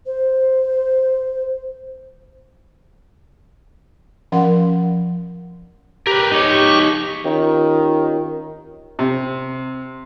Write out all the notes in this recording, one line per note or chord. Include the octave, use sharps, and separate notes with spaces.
C5
F3 C#4 A#4 F5 F#5 C6
G4 A#4 B4
D#4 C#5
G4 C#6
D#3 C#4 F4 G4
C3